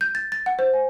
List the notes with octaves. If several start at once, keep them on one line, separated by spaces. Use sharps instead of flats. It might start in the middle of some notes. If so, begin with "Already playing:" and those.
G6
A6
A6
F#5
C5
G#5